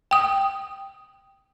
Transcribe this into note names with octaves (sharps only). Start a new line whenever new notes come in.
G5 D#6